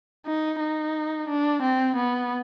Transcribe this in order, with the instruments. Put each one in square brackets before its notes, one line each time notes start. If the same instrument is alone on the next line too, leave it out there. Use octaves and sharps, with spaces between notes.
[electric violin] D#4
D#4
D4
C4
B3